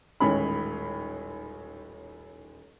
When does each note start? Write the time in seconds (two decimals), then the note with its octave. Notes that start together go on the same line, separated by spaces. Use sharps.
0.20 D#1 A1 D#3 G#3 C#4 B5